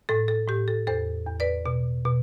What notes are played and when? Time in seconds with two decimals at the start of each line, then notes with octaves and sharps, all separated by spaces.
0.09 A2 A4
0.28 A4
0.48 A2 G4
0.68 A4
0.87 E2 A4 C5
1.27 E2
1.40 B4 D5
1.66 B2
2.05 B2